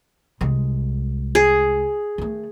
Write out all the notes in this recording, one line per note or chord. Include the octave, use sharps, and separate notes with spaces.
C2 G#3
G#4
D#3 A3